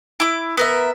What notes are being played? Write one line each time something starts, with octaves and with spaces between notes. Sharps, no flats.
E4 D6
B3 A#4 E5